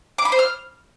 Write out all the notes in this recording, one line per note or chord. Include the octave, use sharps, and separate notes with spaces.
D6
B5
C5
F6